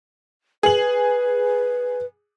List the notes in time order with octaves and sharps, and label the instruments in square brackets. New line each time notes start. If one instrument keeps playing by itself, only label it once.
[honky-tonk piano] G#4 F#7 [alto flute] B4